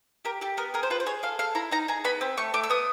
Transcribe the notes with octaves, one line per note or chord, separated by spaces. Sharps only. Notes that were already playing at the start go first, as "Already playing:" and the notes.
G4 A#4
G4 A4
B3 A#4
G#4 A#4
C5
F4 B4
C5
G#4 C#5
A4 F5
A4 F5
E4 A#5
D#4 A#5
G#4 A#5
B3 B5
C4
A3 C#6
A3 D6
E6
B3 D#6